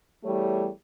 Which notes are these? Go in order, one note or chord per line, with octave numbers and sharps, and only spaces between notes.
E2 G3 A3 G4 C#5